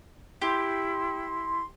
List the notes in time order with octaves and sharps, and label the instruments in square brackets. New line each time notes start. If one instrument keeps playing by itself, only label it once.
[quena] E4 [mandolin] G4 [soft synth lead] C6